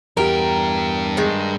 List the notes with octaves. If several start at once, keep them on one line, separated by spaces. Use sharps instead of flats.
E2 G2 G4 A#4 G5
D#3 G#3